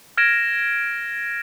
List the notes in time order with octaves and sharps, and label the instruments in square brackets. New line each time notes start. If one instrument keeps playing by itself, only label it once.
[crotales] F6 G#6 A#6 D7 E7